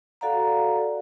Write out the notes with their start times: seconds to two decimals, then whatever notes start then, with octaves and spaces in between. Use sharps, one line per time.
0.21 F#4 A4 D5 F5 F#5 A#5